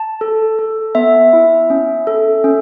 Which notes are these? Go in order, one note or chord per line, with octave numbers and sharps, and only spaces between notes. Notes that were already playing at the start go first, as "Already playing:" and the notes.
Already playing: A5
A4
A4
B3 E5
E4
C#4
A4
C#4